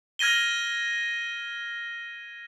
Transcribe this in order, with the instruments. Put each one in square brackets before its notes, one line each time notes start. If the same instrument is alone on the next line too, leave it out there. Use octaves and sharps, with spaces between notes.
[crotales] F6 G#6 A#6 D#7 G7